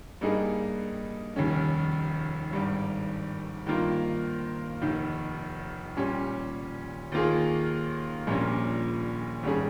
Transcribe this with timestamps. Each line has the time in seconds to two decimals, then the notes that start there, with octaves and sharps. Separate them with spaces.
0.21 G2 G3 A#3 D#4 G#4
1.36 F1 D#2 D#3 G3 C#4
2.51 G#1 G2 G3
3.66 G2 D#3 A#3 F4
4.82 F1 D#2 D#3
5.97 A#2 G3 C#4
7.12 D#2 D#3 A#3 F4 G#4
8.27 A#1 A#2 G3 A#3 C#4
9.43 G#1 G2 G3 C#4 G#4